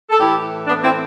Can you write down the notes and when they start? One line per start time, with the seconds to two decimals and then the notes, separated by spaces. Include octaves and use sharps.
0.10 A4
0.19 A2 E3 E4 G4
0.67 B3 D4
0.84 C4 E4